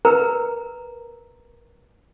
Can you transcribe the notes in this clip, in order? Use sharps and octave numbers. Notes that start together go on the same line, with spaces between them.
A#4 B4 A#5